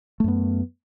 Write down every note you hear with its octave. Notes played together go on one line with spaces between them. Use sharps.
F#2 A3 B3